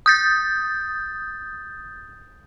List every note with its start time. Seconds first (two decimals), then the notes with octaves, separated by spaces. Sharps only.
0.06 D#6 G6 A6